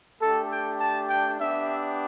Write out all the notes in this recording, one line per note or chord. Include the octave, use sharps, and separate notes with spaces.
A3 D4 G4 A4
G5
A5
G5
B3 D4 G4 E5